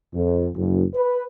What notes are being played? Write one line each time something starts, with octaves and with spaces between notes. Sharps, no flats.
F2
F#1
B4